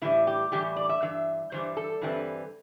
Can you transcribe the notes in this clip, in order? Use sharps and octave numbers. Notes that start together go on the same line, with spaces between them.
A2 E3 G3 E4
G4
A2 E3 G3 G4
D5
E5
G2 E3 E5
G2 E3 G3 C5
A4
G2 E3 G3 C4